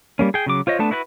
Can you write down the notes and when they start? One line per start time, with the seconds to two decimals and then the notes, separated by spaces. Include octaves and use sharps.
0.19 G3 A#3 C#4
0.34 G#4 G5
0.46 C#3 F#3 D6
0.67 F4 C5 C#5 D#5
0.79 A3 B3 D4 A5
0.91 E4 F#4 B4 G#5 F#6